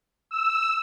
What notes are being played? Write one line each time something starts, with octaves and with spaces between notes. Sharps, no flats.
E6